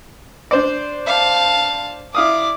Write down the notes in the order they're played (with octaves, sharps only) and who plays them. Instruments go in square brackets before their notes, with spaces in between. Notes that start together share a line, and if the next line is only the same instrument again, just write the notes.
[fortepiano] D4 C5 D5
[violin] F5 A5
[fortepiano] E4 F5 D#6 [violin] D5